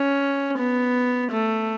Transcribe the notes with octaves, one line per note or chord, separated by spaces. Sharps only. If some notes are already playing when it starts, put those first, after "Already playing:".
Already playing: C#4
B3
A3